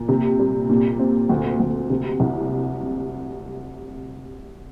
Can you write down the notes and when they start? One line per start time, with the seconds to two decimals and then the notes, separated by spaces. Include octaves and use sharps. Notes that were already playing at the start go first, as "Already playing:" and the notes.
Already playing: A#2
0.09 C3
0.39 G3
0.69 A#2
0.99 C4
1.29 D2
1.60 D2
1.90 C3
2.20 C2